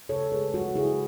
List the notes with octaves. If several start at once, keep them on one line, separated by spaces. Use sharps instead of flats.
C#3 A4 C#5
G#3 G#4 B4
G#3 F#4
C#3 E4 G#4